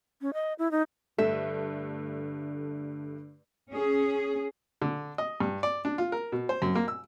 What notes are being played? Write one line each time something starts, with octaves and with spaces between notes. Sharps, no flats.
C#4
D#5
E4
D#4
G2 D3 A3 A4 E5
C#4 G#4
D3
D#5
G2
D5
D4
F4
A#4
B2
C5
F#2
A#3
E6